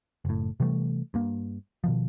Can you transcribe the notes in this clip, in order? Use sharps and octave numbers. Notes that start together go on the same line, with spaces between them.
F#1 A2
C3 E3 G3 A3
G2 A#3
B2 D#3 F3